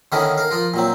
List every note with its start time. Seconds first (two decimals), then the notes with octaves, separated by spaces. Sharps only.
0.12 D3 D#3 B3 C#4 E4 A#4
0.38 A#4 F5
0.51 F3 F4 A#4
0.74 A#2 F#3 C4